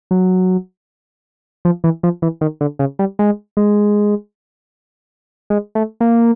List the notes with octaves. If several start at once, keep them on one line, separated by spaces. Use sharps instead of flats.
F#3
F3
E3
F3
E3
D#3
D3
C#3
G3
G#3
G#3
G#3
A3
A#3